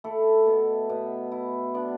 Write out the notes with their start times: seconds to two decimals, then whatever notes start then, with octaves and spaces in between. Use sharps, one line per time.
0.04 A3 E4 A4
0.47 B2
0.90 B2
1.32 E4
1.74 B3 D4 D5